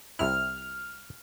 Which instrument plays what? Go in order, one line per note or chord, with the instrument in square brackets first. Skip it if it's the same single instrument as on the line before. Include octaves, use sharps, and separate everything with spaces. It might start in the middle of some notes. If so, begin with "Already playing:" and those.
[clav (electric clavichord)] C2 C3 E4 [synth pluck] F6